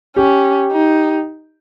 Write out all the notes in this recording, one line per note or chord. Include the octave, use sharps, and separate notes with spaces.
C#4 G4
D#4